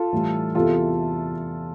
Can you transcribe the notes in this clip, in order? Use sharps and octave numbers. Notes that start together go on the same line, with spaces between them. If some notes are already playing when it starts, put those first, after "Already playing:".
Already playing: F4 A4
A2 E3 G3
E2 C3 E3 F4 A4